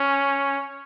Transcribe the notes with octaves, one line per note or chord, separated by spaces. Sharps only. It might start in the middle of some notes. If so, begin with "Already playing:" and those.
Already playing: C#4